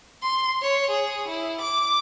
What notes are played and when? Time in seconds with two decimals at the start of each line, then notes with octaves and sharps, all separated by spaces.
0.22 C6
0.62 C#5
0.90 G#4
1.27 E4
1.61 D6